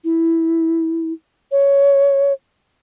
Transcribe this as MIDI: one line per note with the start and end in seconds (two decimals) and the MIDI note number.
0.04 1.13 64
1.52 2.33 73